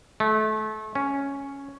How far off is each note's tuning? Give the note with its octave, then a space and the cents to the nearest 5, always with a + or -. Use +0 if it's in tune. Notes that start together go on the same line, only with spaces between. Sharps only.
A3 -30
C#4 +0